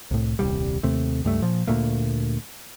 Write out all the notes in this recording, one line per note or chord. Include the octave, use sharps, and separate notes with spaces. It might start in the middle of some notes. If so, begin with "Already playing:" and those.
C2 A2
D#1 C2 G3
D#2 C3 A3
C#2 G2 A3
A#2 F3
D2 A#2 A3 A#3